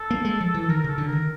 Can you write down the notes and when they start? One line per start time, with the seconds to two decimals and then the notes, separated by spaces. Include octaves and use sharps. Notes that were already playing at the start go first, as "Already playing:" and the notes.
Already playing: A4
0.11 A#3
0.25 G#3
0.41 F3
0.54 E3
0.69 D#3 A#4
0.84 C#3 A4
0.98 D3
1.08 D#3 A#4